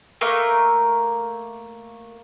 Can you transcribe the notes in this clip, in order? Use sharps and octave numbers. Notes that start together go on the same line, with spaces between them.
A3 A#3 A#4